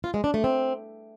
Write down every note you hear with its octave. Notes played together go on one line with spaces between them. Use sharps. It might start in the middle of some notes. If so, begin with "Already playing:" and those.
F4
G#3
D4
A3
C4